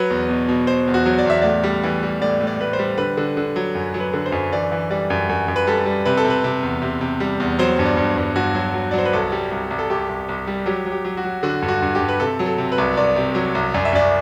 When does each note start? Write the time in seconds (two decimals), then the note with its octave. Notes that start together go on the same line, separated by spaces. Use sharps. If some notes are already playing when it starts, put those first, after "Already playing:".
Already playing: F#3 B4
0.10 E2
0.29 B2
0.49 B2
0.67 B2 C5
0.87 E2
0.94 F#4
1.06 F#3
1.18 D5
1.26 E2 E5
1.42 A2 D5
1.63 G3
1.83 E3
2.03 G3
2.21 A2 D5
2.41 A2
2.47 D5
2.60 A2 B4
2.73 C5
2.79 G3
2.98 D3 B4
3.17 D3
3.37 D3
3.56 F#3
3.75 F#2
3.94 F#3
4.00 B4
4.14 D3
4.26 C5
4.32 F#2
4.52 E3 D5
4.72 E3
4.90 G3 D5
5.10 F#2
5.29 F#2
5.48 F#2
5.56 B4
5.67 G3 A4
5.86 G3
6.05 C3 B4
6.17 A4
6.25 C3
6.30 B4
6.44 C3
6.63 E2
6.82 C3
7.01 C3
7.20 G3
7.40 E2
7.59 F#3 C5
7.79 G2
7.85 D5
7.97 G2
8.17 G2
8.36 G2 F#4
8.55 F#3
8.74 F#3
8.91 D5
8.94 F#3 C5
9.05 B4
9.13 C2 A4
9.32 G3
9.51 C2
9.70 C2
9.79 A4
9.89 C2 G4
10.09 C2
10.29 C2
10.47 G3
10.66 F#3 G4
10.86 F#3
10.92 G4
11.05 F#3
11.17 F#4
11.24 F#3
11.43 D3 F#4
11.62 G2
11.68 F#4
11.82 G2
11.95 G4
12.00 G2
12.08 B4
12.20 C3 A4
12.39 F#3
12.46 A4
12.58 C3
12.72 B4
12.78 C2
12.97 C2 D5
13.16 C3
13.35 F#3
13.55 C2
13.74 F#2 D5
13.85 E5
13.93 F#2 D5